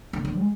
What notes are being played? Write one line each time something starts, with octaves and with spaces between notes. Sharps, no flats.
D3
D3
G#3